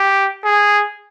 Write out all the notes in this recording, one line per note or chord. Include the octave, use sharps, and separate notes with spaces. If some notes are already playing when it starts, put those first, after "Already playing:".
Already playing: G4
G#4